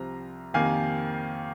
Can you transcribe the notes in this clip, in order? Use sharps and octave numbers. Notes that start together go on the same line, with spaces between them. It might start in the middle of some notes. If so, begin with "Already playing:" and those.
Already playing: C2 C3 F3 C4 A#5
F2 C3 D#3 A#3 F5 G#5